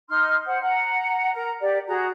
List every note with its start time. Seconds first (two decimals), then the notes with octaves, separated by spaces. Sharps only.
0.09 D#4 C6 F6
0.46 C5 F#5
0.62 F#5 A#5
1.34 A#4 A#5
1.61 G4 D5
1.87 F#4 G#4 A#5